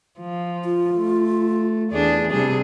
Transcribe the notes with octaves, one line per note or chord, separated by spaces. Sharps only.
F3
F4
A3
E2 D4 G#4
C3 G3 D4 G#4